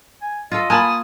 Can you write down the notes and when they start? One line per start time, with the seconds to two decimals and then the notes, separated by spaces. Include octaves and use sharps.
0.22 G#5
0.52 F4 A4 D#5
0.70 A#3 G#5 A5 B5 D#6